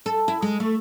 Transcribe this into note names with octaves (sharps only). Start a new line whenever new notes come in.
A4
E4
G#3
A3